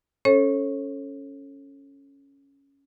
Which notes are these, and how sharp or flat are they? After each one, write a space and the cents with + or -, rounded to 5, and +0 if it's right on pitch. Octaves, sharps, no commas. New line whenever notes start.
C#4 +0 A4 +0 C#5 -35